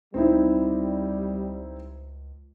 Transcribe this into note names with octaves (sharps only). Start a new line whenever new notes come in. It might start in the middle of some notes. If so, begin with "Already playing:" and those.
C#2 G3 C4 D#4 E4